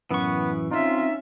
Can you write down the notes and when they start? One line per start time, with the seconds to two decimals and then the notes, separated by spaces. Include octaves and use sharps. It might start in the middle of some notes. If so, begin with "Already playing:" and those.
0.11 F#2 A2 E3 B3 C#6
0.71 C4 C#4 D#4 F4 E5